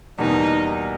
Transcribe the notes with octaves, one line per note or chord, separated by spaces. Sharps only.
E2 B2 G3 A#3 D#4